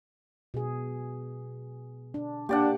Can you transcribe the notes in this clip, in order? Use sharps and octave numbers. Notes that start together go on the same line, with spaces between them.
B2 G#4
D4
A#3 D4 G4 D5 F#5